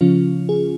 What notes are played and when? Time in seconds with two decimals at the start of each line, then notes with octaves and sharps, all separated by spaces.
0.01 C#3 F3 C#4 F4
0.49 G#4